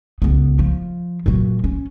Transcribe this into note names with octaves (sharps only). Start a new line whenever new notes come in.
C#2 B3
F3
A#2 F#3
C#4